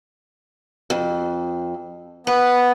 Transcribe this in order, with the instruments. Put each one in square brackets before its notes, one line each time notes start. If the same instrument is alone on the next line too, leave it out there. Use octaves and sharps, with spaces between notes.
[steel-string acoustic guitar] F2
[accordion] B3 [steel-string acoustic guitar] B4